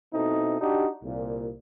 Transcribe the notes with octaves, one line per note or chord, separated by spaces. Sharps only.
B2 C4 D#4 E4 A4
D4 D#4 F#4 G4
C2 A#2